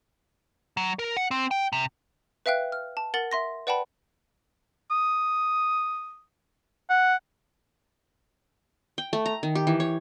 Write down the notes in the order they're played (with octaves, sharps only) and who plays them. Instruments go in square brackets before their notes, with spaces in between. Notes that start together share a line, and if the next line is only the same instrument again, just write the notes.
[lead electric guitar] F#3
A#4
F#5
C4
G5
C3
[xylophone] B4 E5 F5 G5 F#6
F6
A5
A#4 F#5 A6 F#7
E5 C6 A#6
B4 D5 F#5 G5 A5 B5
[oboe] D#6
F#5
[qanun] G5
A3
A#5
D#3
G4
E3
C#5